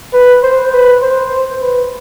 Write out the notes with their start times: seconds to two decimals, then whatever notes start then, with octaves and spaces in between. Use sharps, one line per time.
0.13 B4
0.43 C5
0.72 B4
1.02 C5
1.61 B4